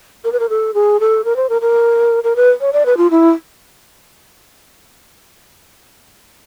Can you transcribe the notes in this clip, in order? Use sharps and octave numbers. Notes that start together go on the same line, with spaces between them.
A#4
B4
A#4
A4
G#4
A4
A#4
C5
A#4
A#4
A#4
B4
C#5
D5
B4
F4
E4